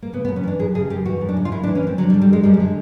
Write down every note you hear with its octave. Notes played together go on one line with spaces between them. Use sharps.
A#3
C#3 B3
B3
F#2
C#4
E3 D4
F#2 G#4
C#3 G#4
F#2 G4
E3 F#4
F#2
D4
C#3
F4
F#2 E4
D4
E3
C#4
F#2 C4
D3 F#3
G3
D3
G3
F#2 G#3
F#2 G3
G#3
D3